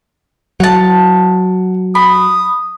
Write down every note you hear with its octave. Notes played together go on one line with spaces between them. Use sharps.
F#3 F#5 A5
B5 D#6